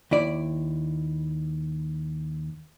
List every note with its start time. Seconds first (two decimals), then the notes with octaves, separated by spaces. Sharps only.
0.11 D#2 E4 D5